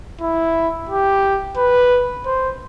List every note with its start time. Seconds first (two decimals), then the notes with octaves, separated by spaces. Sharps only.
0.21 E4
0.89 G4
1.57 B4
2.26 C5